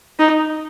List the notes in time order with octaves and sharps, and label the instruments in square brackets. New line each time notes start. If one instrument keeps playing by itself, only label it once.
[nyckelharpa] D#4